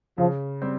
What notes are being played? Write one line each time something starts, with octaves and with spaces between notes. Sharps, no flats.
C#3 F3
G3 C4